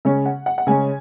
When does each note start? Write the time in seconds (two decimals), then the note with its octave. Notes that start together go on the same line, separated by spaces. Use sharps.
0.05 C#3 G#3 C#4 C#5
0.26 F#5
0.46 F#5
0.58 F#5
0.67 C#3 G#3 C#4 G#5